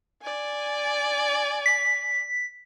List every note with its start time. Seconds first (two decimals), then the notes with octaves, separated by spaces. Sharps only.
0.22 D5 G#5
1.66 B6